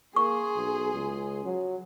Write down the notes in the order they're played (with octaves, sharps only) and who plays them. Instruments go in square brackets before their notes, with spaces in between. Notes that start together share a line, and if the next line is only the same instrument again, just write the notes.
[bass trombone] A#3 [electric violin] G#4 C6 [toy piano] C#6
[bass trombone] B1
C#2
F#3